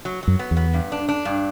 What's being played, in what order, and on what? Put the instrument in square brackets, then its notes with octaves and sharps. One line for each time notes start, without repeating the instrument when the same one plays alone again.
[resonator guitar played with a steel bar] F#3
[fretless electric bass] F#2 [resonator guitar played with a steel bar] F#3
[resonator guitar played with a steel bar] B3
[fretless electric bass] E2
[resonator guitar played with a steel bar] B3
G2
D4
D4
G2